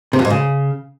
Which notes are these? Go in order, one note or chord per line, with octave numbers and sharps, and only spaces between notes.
C3
F2
G#2
C#3